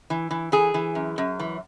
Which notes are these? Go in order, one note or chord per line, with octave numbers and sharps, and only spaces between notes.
E3
E3
E3 G#4
E3
F#2
F#2
E3